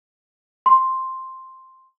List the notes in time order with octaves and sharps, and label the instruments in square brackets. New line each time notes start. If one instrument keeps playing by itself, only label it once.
[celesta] C6